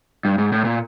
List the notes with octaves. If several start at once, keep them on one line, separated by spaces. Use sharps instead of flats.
G2
G#2
A2
A#2